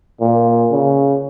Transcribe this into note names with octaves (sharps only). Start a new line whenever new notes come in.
A#2
C#3